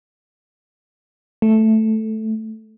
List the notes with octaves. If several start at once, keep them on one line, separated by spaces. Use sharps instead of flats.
A3